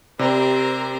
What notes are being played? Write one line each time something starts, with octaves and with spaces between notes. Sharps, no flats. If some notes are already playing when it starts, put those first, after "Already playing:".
C3 G3 C4 G4 A#4 C5